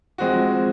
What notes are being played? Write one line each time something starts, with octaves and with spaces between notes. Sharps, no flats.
F3 G#3 C4 F#4